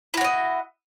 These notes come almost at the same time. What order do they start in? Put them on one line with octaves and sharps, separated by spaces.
E4 F#4 C#5 D#5